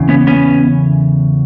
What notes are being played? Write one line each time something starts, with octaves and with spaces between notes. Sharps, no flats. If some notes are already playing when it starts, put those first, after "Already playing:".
Already playing: E2 C#3
B3 C#4
B3 C#4